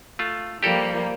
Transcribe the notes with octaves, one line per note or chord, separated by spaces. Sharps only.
A3 F4
F3 G3 A#3 G4 A4 A#4